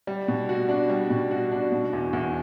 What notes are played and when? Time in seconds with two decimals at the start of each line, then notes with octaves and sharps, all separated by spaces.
0.07 G3
0.28 B2
0.49 F#4
0.69 D4
0.89 G3
1.10 B2
1.31 F#4
1.52 D4
1.72 B2
1.93 E2
2.13 E2